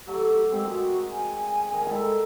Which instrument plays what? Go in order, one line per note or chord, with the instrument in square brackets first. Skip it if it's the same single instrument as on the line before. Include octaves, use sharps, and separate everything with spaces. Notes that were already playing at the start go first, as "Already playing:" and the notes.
[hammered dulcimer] F#3 A3 [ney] G4
[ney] G#3 [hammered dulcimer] C4 G4 A#4
[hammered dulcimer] G#3 [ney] F#4
[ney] G#5
[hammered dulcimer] D#3 A#4
[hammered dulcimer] G3 E4 A4 [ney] G#3